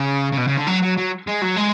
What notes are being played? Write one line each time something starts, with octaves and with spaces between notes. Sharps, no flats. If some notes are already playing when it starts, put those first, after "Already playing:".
Already playing: C#3
C#3
B2
C#3
D3
F#3
F#3
F#3
G#3
F#3
G#3